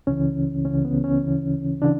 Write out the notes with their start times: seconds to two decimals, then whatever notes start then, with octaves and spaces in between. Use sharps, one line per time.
0.07 C#2 C#3 E3 C#4
0.65 C#2 C#3 E3 C#4
0.85 B3
1.04 C#4
1.23 D2 C#3 E3
1.82 C#3 E3 D4